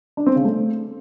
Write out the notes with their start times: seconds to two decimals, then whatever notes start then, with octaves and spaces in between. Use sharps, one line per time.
0.17 D4
0.26 C4
0.36 C#3
0.45 A3